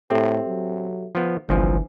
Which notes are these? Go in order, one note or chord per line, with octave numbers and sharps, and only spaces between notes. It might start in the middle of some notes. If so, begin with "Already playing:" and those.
A2 C4 G4 A4 E5
F#3
F3 B3
G1 C2 E3 F3 D4 G#5